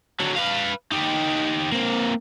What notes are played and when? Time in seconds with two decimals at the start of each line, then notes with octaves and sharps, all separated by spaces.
0.21 D3 F#3
0.36 B4 F5
0.92 D#4 G4
1.72 A#3 C4